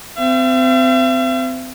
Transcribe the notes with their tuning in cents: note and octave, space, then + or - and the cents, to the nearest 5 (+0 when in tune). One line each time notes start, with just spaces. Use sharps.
C4 -30 E5 +45